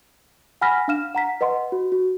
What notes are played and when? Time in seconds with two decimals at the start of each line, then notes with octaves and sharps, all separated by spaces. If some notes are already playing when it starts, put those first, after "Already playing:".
0.61 F#5 G#5 B5 F6 A#6 B6
0.88 D4 F5 F6 E7
1.15 F#5 A#5 B6
1.41 B4 D#5 F#5 C6
1.72 F#4
1.92 F#4